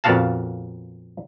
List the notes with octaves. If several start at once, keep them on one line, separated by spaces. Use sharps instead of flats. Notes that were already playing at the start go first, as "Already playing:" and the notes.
F2 A#2 B3 F#4 F5 A5